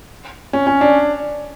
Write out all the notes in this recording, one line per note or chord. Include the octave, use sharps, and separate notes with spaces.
C#4
C#4
D4